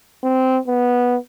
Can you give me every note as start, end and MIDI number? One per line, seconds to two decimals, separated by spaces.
0.23 0.58 60
0.68 1.16 59